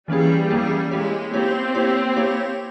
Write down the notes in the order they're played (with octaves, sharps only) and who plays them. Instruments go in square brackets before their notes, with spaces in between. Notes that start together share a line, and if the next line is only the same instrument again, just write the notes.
[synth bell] E3 A#3 C#4 E4 G#4 [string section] G3
[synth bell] E3 A#3 C#4 E4 G#4
[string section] G#3 [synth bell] A#3 E4 G4 C#5
[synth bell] A#3 E4 G4 C#5 [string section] C4
[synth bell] A#3 E4 G4 C#5
A#3 E4 G4 C#5